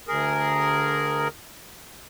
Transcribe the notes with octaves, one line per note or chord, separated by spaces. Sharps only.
D2 G#4 A#4